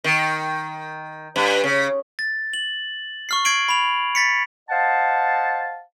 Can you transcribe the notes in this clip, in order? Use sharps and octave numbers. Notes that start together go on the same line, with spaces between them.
D#3
G2
C#3
A6
F#7
C#6 F6 C7
G#6 C7 D7 F#7
B5 F7
A6 B6 C#7
C5 D#5 F5 F#5 A5